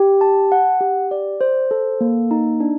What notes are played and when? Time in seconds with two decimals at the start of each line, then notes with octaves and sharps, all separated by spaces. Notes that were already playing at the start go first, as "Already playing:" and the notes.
Already playing: G4
0.21 A5
0.52 F#5
0.81 G4
1.11 D5
1.41 C5
1.71 A4
2.01 A#3
2.31 D#4
2.60 D4